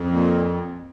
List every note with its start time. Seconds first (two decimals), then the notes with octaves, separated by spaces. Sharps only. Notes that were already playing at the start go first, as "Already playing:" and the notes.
Already playing: F2
0.10 A#2